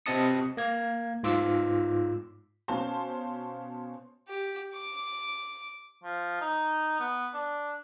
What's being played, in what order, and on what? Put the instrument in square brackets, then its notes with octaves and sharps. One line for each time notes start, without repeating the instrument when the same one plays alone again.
[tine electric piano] C3 C4 D#5 A5 D#6 C#7
A#3 G#6
G#2 F4 D6 E6
[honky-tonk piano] B2 C#4 C5 F5 A5 C6
[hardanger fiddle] G4
D6
[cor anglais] F3
D#4
B3
D4